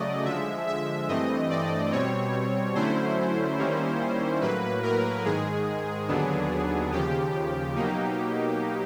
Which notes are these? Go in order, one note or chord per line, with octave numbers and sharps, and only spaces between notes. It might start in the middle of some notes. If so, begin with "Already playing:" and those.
Already playing: C#3 F#3 A3 D5 D#5
D3 F3 G#3 E5
E5
G2 E3 A3 C4 D#5
D5
B2 G3 C4 C#5
D3 F#3 A3 C#4 E4 C5
D#3 G3 A#3 C#4 E4
A2 F#3 A#3 B4
A#4
G#2 D#3 G#3 G#4
D#2 D3 F#3 B3 D4
D#2 C#3 F3 G4
B2 F#3 A#3 D#4